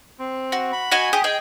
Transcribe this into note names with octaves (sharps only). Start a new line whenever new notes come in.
C4
F#4
B5
F#4 D#5 G#5
G4 G#4 D#6
G#4 D#5 G5